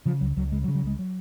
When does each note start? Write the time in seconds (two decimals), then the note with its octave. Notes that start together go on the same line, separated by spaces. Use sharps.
0.06 C#3 F3
0.21 C#2 F#3
0.37 C#2 F#3
0.52 C#3 G#3
0.64 F#3
0.68 C#3
0.75 F#3
0.83 C#2 G#3
0.99 F#3